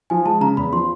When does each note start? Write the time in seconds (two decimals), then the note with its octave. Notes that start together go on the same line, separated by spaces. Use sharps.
0.10 F3 G#5
0.25 G#3 A5
0.41 C#3 A#5
0.57 E2 B5
0.72 F3 C6